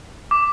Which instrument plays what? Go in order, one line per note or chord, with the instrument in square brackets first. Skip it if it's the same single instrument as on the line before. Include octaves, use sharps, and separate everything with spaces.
[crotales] D6